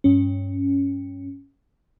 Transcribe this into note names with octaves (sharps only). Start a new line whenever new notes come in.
G2 C#4